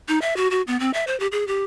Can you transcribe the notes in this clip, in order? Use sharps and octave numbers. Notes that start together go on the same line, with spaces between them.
D#4
E5
F#4
F#4
B3
C4
E5
C5
G4
G#4
G4